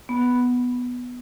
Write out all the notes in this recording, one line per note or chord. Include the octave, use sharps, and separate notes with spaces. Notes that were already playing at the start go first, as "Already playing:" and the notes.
B3